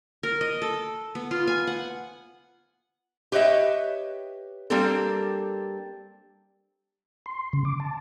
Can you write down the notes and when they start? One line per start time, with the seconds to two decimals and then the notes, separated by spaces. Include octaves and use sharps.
0.23 A#4
0.41 D#5
0.62 A4
1.15 B3
1.31 F4
1.47 G#5
1.67 F#5
3.32 G4 B4 C#5 D#5 E5
4.70 G3 A#3 C4 D4 G4 A4
7.26 C6
7.53 C#3
7.65 D6
7.80 A5